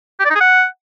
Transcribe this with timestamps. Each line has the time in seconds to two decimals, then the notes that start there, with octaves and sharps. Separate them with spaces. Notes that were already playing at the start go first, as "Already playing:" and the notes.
0.20 G4
0.25 D5
0.30 D#4
0.35 G#4
0.41 F#5